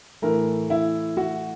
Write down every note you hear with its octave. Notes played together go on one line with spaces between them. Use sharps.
A2 E3 A3 A#4
E4
F#4